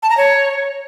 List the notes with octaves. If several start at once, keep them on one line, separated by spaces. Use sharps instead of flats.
A5
A#5
C#5